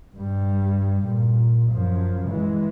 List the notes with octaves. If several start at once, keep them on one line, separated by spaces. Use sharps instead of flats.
G2 G3
A#2
F#2 F3
E3 G#3